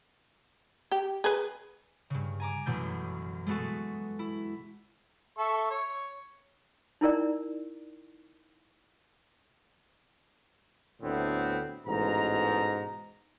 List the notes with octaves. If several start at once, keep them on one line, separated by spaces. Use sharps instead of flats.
G4
G#4 B4
G2 C#3
G#5 A#5 D6
A1 F#2 B2 A3 G6
G#3 A3 B3 F#4 A4
E4
A4 E5 C#6
C#5 C#6
D#4 E4 A#4 D5
D2 A2 D3 B3 C4
A1 G#2 B2 A#5